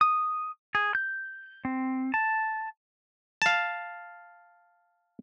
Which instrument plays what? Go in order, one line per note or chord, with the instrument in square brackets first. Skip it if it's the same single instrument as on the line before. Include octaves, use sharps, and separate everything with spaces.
[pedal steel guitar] D#6
G#4
G6
C4
A5
[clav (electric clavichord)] F5 A5